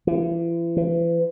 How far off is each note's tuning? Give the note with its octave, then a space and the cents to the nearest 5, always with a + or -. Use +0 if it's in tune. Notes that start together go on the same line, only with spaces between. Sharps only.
E3 +40
E3 +40